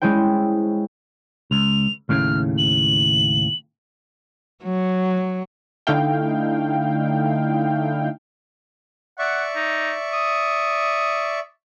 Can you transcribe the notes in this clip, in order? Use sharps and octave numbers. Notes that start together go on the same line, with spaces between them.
G#3 C#4 E4 C5 G5
C#2 F7
D#2 A2 C#3 F6
F#7
F#3
D3 A3 D#4 E4 F5 G5
D5 E5 F#5 C#6
D#4
D#6